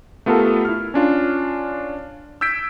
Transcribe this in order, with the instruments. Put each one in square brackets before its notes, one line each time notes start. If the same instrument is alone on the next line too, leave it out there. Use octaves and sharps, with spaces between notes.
[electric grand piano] A3 B3 F4 G4 A4 A#4
E4 F6
C#4 D4 F4
E6 G6 G#6 B6 D7